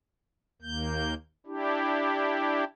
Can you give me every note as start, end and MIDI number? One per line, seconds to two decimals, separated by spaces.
0.62 1.14 39
0.62 1.14 58
0.62 1.14 91
1.46 2.64 62
1.46 2.64 64
1.46 2.64 67